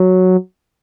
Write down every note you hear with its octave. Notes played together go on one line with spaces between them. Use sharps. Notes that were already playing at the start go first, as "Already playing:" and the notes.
Already playing: F#3